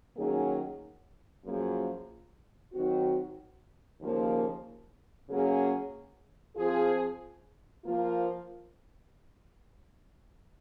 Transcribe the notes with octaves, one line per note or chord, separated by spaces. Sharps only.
D#3 F#3 A#3 C#4 G#4
F#2 F3 A#3 F4 G#4
D#3 F#3 C4 F#4
D#2 C#3 F3 A#3
C#3 F#3 A#3 C#4 G#4
F3 C4 F4 G#4
F3 A#3 F4